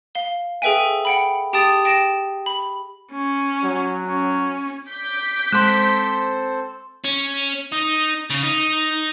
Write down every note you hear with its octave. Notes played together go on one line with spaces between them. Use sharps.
F5 G7
G#4 A4 B4 E5 G5 G#5
F#5 G5 B5
G4 G5 A5 D#6 A6
G5 A#6 E7
B5
C#4
F#3
C#4
D6 G6 B6
G#3 C4 A4 C5 C6 E7
C#4
D#4
C#3
D#4